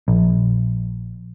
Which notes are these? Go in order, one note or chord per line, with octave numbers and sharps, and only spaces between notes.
A#1